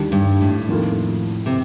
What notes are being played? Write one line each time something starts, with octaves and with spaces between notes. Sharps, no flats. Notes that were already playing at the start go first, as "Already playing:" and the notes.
Already playing: D#2 D3 G3 D4 G4
G2
A2
F2 D#3 A#3 F4 A4
C3